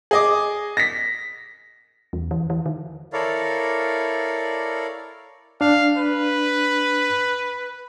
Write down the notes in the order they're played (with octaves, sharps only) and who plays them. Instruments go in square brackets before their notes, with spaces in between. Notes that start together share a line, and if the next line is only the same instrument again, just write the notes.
[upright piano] G#4 D#5 D6
A#6 B6
[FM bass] E2
E3
E3
D#3
[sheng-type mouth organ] E4 A4 A#4 C#5 D5 F5
[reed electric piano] D4 [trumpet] F5
[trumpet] B4